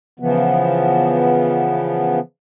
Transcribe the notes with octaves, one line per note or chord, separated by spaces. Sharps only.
C#3 E3 F3 B3